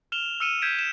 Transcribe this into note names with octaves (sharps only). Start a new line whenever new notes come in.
F6 E7 F7 G7
E6 F6 C#7 D#7 E7
G6 G#6 B6 D7 E7
E7